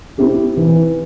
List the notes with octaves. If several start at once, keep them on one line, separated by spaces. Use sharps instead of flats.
C4 E4 G4
E3